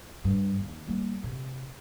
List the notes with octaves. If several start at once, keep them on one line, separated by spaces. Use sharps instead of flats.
G2
D#2
G3 A#3
C3